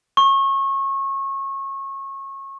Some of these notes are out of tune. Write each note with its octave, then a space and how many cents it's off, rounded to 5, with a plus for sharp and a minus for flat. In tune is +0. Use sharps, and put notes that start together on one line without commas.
C#6 -25